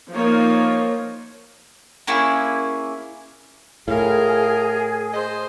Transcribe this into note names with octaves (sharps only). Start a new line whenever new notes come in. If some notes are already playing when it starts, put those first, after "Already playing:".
F3 A#3 D#4 F4 A#4 C#5
A#3 C#4 E4 G#4
A2 F4 G#4 A#4
C5 D#5